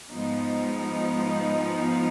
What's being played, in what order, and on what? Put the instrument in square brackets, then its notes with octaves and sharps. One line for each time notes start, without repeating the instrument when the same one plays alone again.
[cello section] G#2 F3 G#3 B3 D#4